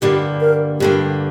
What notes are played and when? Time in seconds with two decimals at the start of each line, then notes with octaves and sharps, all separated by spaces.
0.02 G2 D3 G3 A#3 G4
0.41 A#4
0.80 G2 D3 G3 A#3 G4